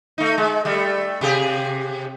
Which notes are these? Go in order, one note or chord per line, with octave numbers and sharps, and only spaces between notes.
A3 D#4
G#3
G3 A3
C3 G4 G#4